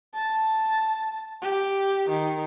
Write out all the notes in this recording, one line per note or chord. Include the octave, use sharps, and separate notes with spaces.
A5
G4
D#3